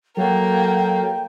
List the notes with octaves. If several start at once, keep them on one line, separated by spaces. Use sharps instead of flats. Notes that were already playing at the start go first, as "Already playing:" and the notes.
F#3 A#3 A4 G5